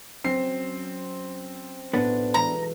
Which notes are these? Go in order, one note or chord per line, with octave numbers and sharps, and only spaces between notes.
F#3 C4 C#4 C7
B1 A2 B3 D4
E3 G#3 E4 A#5